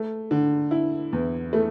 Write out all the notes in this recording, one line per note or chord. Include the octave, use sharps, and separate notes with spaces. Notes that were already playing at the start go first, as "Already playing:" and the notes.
Already playing: A3
D3
E4
E2
A3